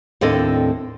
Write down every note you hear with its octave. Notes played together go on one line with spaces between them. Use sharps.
D#2 A2 C4 D4 A4 D#5